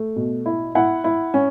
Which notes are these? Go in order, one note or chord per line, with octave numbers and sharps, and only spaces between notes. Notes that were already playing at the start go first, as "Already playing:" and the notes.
Already playing: A3
B2
E4
E4 F#5
E4
C#4